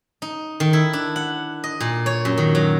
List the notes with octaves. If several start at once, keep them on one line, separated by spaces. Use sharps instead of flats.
D#4
D#3
E4
D4
F#5
D#5
A#2
C#5
F#2
D#3
F#3